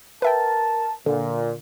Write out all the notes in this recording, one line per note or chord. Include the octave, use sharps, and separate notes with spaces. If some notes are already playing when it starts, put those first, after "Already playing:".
A#4 B4 E5 G5 A5
A#2 D3